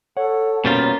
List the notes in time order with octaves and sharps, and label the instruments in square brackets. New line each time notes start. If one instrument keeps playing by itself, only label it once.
[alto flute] A4 [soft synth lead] C#5 [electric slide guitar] F#5
[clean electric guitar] B2 G3 F4 [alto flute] A#3 [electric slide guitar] C#4 B4 C5